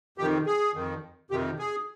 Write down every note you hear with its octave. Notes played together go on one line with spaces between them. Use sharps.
F2 C3 D#3 G4
G#4
F2 D#3
F2 C3 D#3 G4
G#4